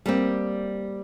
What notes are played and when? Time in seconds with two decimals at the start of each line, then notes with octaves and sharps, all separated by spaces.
0.06 G3 A#3 C4